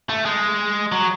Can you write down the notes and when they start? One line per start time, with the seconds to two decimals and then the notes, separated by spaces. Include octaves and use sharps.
0.09 A3
0.25 G#3
0.92 F#3